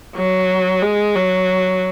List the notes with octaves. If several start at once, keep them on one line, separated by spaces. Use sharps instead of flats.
F#3
G#3
F#3